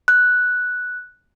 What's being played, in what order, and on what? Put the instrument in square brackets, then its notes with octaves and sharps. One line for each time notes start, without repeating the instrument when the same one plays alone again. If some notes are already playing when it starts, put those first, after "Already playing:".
[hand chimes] F#6